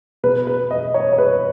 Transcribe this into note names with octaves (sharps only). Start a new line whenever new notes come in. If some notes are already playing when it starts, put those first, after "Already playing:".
B2 B4
B4
D#5
C#5
C#5
B4